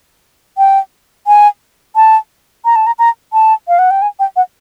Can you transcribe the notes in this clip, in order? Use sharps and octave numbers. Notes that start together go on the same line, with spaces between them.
G5
G#5
A5
A#5
A5
A#5
A#5
A5
F5
F#5
G5
G#5
G5
F#5